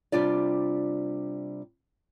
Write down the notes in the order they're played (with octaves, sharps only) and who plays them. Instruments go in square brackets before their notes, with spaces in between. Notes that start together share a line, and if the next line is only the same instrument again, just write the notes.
[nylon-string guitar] C3 G3 D4 F4 D5